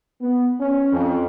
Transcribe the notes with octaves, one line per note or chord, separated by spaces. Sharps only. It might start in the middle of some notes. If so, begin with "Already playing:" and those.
B3
C#4
F2